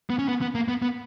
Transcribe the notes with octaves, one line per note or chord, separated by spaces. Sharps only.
B3
C#4
B3
B3
A#3
B3
B3